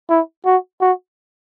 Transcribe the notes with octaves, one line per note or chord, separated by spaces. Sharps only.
E4
F#4
F#4